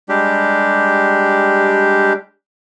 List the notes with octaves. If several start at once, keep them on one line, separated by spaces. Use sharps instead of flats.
G3 G#3 D4 G4